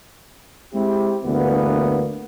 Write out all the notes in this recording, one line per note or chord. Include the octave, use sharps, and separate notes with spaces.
G#3 C4 E4 G4
D2 G2 E3 A#3 B3